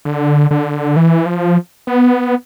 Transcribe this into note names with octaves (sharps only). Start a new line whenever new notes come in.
D3
D3
E3
F3
B3